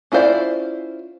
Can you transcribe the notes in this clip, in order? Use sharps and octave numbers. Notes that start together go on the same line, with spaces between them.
C#4 E4 F4 C5 D5